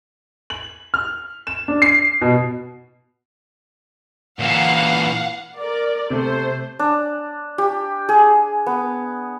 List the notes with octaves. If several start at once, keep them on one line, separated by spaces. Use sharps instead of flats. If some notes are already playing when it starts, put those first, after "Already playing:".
F#7
F6
E7
D4
C7
B2
A#2 E3 F5 F#5
A#4 D5
C3 A3 C5
D4
G4
G#4
B3